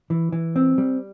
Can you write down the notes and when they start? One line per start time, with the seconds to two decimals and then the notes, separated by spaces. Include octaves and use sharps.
0.10 E3
0.32 E3
0.56 C4
0.78 G3